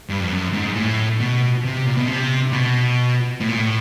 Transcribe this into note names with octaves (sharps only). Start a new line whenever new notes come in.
G2
F2
F#2
G#2
A2
B2
C3
A#2
B2
C3
B2
A2
A#2
A2